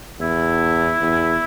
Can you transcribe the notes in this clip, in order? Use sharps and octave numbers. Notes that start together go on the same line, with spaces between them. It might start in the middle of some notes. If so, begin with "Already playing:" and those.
E2 E4
E2